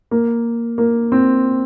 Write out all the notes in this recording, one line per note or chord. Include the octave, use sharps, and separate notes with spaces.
A#3
A#3
C4